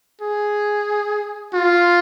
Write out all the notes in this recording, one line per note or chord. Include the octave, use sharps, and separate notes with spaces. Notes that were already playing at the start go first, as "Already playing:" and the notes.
G#4
F4